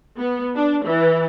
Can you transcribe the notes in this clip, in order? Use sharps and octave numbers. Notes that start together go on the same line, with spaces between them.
B3
D4
E3